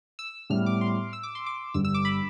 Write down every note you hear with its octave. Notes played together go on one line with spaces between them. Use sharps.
E6
A2 G3 B3 F6
D6
C6
E6
D6
C6
D6
G1 G2 D3 G3 E6
E6
D6
B5